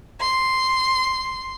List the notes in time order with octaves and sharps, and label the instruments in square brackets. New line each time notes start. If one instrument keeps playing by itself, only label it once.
[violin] C6